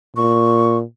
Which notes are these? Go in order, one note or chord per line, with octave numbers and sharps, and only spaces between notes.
A#2 C#6